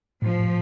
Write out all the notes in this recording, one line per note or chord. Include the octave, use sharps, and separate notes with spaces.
A2 F3